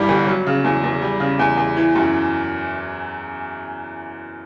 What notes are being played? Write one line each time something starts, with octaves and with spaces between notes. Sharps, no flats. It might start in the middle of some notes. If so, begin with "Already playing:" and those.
Already playing: G2 E3 G3
G1
F#3
C#3
E2
E2
G3
C#3
E2
E2
E3
F#2